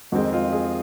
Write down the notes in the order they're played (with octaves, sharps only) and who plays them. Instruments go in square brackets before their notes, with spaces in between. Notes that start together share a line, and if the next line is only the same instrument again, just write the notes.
[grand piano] F2 D#3 G#3 C4 F#4
F4
G#4